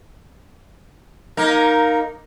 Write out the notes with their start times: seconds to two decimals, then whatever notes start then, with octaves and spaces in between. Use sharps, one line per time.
1.37 A#3 D#4 A#4